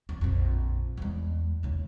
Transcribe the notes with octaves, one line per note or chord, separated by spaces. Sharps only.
E2
A#1 F2
E2 G#3
D#2 C#3